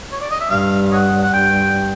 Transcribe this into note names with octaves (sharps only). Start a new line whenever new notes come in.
C#5
D5
D#5
E5
G2 F5
C#5 D#5 F#5
F#5
G2 G5